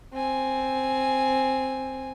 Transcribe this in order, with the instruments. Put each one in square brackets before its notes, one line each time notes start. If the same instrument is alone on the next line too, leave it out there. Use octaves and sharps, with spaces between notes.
[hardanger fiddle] C4 G#5